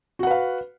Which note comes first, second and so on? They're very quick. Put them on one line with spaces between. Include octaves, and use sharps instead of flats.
F#4 F#5 B4 F5